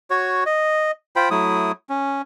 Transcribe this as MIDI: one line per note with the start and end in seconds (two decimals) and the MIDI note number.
0.10 0.44 66
0.10 0.44 73
0.46 0.91 75
1.16 1.29 65
1.16 1.29 72
1.16 1.29 79
1.16 1.29 83
1.31 1.72 54
1.31 1.72 57
1.31 1.72 64
1.31 1.72 87
1.89 2.22 61